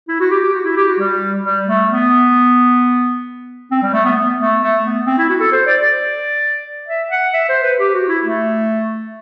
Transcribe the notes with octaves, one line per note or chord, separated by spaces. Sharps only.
E4
F#4
G4
G4
F#4
E4
G4
F#4
G3
G3
A3
B3
C4
G3
A3
B3
B3
A3
A3
B3
C4
E4
F#4
A4
C5
D5
D5
E5
F#5
E5
C5
B4
G4
F#4
E4
A3